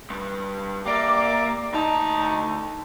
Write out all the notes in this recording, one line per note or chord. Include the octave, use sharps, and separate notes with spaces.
G2 G3
A#3 G4 D5 E5
D2 D#4 A5